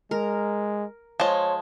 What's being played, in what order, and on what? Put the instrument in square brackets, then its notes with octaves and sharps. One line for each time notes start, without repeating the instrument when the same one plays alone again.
[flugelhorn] G#3 [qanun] A#4
[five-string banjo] F3 G#3 [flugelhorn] C#5 [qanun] A5